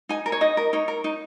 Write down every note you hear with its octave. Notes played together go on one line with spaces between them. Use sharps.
D#4 G#5
A#4
C#5
D#4 D#5
A#4
D#4 C#5
A#4
D#4